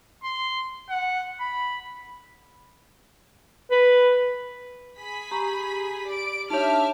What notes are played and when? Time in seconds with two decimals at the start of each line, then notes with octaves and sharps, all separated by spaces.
0.24 C6
0.90 F#5
1.40 B5
3.71 B4
4.99 G#4 B5 B6
5.31 G4 A#5 C#6
6.07 D5 D7
6.50 D4 D#4 G4 C#5 E5 A5 D6 F6